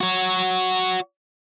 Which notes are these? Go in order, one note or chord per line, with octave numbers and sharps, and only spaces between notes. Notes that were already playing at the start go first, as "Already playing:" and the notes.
F#4 C#5